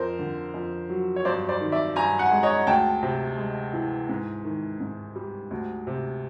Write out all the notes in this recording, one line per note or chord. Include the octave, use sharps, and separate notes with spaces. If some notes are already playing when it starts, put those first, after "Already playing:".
Already playing: F2 A#4 C5
D3
F2
F#3
C#5
G2 C5 D5
C5 D5
D#3
D5 E5
G2 G#5 A#5
F#5 G#5
G#3
C#5 D#5
D2 G5 A5
C3
G#3
E3
G#2
D#3
G#2
G3
D2
C3